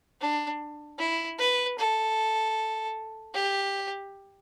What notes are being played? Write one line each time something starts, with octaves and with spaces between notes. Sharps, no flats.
D4
E4
B4
A4
G4